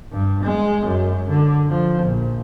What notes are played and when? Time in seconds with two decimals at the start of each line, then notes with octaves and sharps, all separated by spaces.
0.12 G2
0.44 G#3
0.86 F#2
1.29 D3
1.69 F3
2.03 A#1